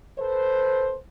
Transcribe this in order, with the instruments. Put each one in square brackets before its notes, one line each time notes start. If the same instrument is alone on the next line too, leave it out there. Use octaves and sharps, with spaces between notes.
[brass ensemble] A4 B4 C5